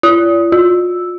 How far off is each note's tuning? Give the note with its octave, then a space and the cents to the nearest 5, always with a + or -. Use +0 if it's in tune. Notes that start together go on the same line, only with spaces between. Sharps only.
F4 -45
F4 +35